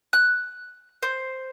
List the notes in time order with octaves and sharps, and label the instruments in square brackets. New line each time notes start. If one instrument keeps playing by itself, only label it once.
[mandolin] F#6
C5